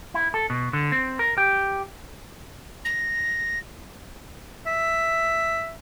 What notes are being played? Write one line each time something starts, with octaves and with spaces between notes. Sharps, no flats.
E4
A4
B2
D3
C4
A#4
G4
A#6
E5